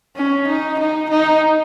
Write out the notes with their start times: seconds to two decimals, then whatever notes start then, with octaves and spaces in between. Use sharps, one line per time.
0.16 C#4
0.48 D#4
0.79 D#4
1.10 D#4